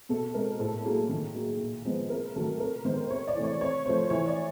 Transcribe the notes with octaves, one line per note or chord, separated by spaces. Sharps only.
B2 A4
G#3 C4 A#4
A2 A4
F#3 A#3 G#4
D#3
F#3 A#3
A#2
F3 G#3 B3
C3 A#4
D#3 F#3 A3 A4
C3 A#4
D#3 G#3 B3 C5
C3 C#5
D5
E3 A3 C4
C#5
C3 C#5
F3 A3 C4 C5
E3 C#5
D5